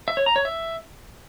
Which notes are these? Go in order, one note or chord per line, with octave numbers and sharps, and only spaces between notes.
E5
C#5
A#5
C#5
E5